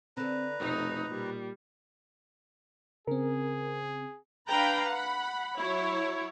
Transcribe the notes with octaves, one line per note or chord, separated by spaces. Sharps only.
D3 C4 A4 B4 A#5
F1 B2 A3 C4 D#4
A#2 G3
C#3 C4 G#4 A#4
D4 B4 F5 G5 A#5 B5
F#5 B5
F#3 E4 C#5